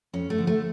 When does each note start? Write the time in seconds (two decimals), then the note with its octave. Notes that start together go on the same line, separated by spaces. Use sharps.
0.13 F2 C#4
0.30 A3
0.38 D3 F3
0.47 A3